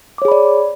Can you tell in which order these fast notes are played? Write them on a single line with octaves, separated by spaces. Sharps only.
D6 C#5 G#4 B5 D5